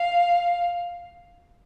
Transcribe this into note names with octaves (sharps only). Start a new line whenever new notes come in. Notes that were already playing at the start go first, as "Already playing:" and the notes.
Already playing: F5